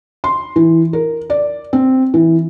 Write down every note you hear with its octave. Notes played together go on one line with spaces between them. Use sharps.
C6
E3
A#4
D5
C4
E3